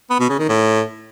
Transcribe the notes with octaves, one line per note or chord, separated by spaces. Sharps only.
B3
B2
C#3
D#3
A2